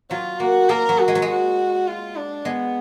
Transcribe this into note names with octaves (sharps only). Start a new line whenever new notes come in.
F#3 F4
A#3 F#4
A#3 A#4
F#3
F#4
G#3
F#3
G#3
F#4
F4
D4
G#3 B3